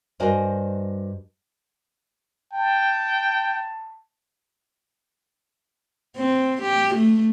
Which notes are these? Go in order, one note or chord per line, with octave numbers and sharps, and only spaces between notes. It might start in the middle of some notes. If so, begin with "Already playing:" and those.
G2 F#4 A#4 C5 D#5 G#5
G5 A5
C4
G4
A3